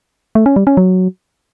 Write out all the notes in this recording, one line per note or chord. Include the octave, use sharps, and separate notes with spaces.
A3
C#4
G3
C#4
F#3